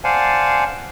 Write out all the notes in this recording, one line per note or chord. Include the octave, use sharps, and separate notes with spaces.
C5 D5 F5 F#5 G#5 A5